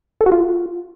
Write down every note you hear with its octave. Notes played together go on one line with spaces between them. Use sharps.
A4
F#4
F4